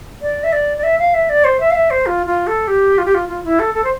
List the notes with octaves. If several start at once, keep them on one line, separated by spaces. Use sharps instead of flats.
D5
E5
D5
D5
E5
F5
E5
D5
C5
E5
F5
E5
C5
F4
F4
A4
G4
F4
G4
F4
F4
E4
A4
A4
C5